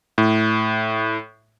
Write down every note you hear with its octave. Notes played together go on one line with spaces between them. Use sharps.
A2